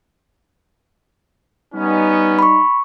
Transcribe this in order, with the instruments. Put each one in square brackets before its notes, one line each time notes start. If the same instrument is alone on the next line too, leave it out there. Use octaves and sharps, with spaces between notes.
[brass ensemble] G3 D#4 [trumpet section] B3 C#4
[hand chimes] B5 C#6